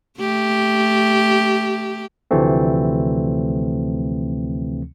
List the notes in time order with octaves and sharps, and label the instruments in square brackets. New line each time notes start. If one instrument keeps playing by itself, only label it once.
[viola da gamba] A3 G4
[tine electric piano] D2 C3 E3 F3 A3 C4